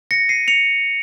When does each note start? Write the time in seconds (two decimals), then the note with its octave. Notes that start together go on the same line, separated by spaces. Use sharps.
0.11 A#6 C#7
0.29 C7 D#7
0.48 C#7 F7